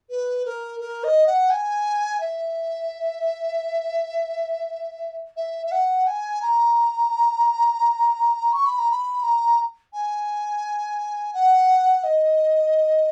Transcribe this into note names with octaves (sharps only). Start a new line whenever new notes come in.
B4
A#4
A#4
D#5
F#5
G#5
E5
E5
E5
F#5
G#5
A#5
C#6
B5
A#5
B5
A#5
G#5
F#5
D#5